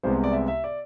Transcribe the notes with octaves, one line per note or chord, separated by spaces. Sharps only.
C2 C3 G#3 B3 C5
D5
E5
E5
D5